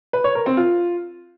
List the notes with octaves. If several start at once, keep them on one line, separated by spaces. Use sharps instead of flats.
B4
C#5
A#4
C4
F4